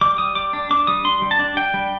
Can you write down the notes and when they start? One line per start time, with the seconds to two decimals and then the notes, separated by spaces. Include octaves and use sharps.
0.01 G3 D6
0.18 G3 D#6
0.35 G3 D6
0.53 D4
0.71 D4 D6
0.87 G3 D#6
1.05 D4 C6
1.22 G3
1.31 A5
1.39 D4
1.57 D4 G5
1.74 G3